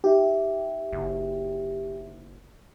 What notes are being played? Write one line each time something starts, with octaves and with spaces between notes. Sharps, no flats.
D#4 G4 E5
F#1